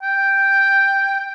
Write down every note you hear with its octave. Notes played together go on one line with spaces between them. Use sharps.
G5